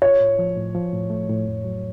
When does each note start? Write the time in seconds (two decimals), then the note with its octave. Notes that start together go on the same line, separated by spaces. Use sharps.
0.02 F4 C#5
0.20 A2
0.39 F3
0.56 A2
0.75 F3
0.92 A2
1.10 A3
1.29 A2
1.46 F2
1.64 F#3